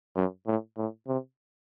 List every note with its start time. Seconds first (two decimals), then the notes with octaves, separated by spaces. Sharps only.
0.16 F#2
0.47 A2
0.77 A2
1.07 C3